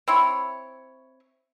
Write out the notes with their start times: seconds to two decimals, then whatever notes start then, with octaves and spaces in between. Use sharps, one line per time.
0.08 C4 E4 C#5